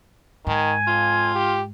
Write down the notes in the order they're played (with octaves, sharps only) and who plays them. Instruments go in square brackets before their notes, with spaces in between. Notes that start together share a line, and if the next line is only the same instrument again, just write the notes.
[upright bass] G#2 [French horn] D#3 [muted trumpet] G#5
[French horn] F2 [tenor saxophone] F4
[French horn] G4